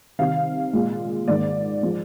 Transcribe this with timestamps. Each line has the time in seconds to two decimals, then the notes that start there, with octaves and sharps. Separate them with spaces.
0.19 C3 D#3 G3 F5
0.73 A#2 G#3
1.28 G#2 D#3 A#3 D5
1.83 F3 G#3